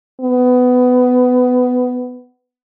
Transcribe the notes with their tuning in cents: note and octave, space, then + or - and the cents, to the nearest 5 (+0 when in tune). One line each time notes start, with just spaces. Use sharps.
B3 +20